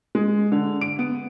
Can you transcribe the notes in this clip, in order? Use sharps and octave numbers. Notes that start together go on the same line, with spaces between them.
G#3
D3
D7
B3